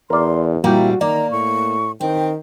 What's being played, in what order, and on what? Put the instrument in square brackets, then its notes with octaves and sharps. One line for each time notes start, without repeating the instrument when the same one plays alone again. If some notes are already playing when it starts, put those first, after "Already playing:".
[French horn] E2 [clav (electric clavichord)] A#4 D5 [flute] C6
[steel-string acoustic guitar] A#2 G3 C4 [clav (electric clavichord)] A#3 G5 [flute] E4 [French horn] F#4
[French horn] D#3 [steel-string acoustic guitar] A#3 [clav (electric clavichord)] D5 [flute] A#5
[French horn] A2 [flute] C#6
[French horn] D#3 [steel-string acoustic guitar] C4 [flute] G5